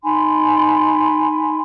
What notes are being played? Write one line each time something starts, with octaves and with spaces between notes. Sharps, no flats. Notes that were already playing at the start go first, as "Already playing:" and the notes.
D#4 G#5 B5 C6